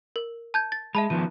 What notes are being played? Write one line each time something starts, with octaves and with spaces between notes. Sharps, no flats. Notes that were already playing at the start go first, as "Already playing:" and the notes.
A#4
A5 G6 G#6
A6
G#3 E5 A5 B5
D#3 F3 B3 D#7